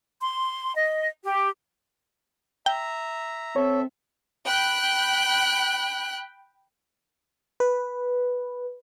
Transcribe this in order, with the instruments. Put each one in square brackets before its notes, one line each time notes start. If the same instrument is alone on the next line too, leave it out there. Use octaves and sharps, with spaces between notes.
[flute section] C6
D#5
G4
[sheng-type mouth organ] E5 A#5 [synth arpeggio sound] G5
[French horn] C4 [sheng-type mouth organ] A4 E5 [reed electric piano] C#5
[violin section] G5 B5 F#6
[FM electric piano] B4